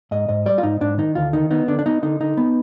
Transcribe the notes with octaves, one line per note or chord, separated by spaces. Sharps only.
G#2 D#5
G#2 D#5
G3 D5
F4
G#2 D#4
G#2 D4
D#3 D#4
D2 F4
D#3 D#4
B3 D#4
D3 D4
D4
B3 D#4
D3 D#4
D3 D#4
B3